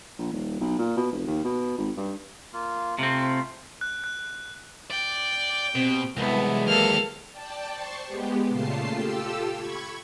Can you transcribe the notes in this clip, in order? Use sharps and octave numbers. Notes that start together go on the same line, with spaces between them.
A#1
D#1
B1
A#2
B2
F1
D#2
B2
G#1
G2
A#3 F4
C3 A3 C4 F4
F#6
F#6
D5 G5
B2 C4 G4
C2 E3 F#3 G#3 A3 B3
D#2 A#3 A4 F6
D5 G5 A5
C5 A5 C6 C#6
G#3 B3 G4
A#2 C#3 A3 F4 A5 C7
F4 G4 A4 E6
B5 C#6 G#6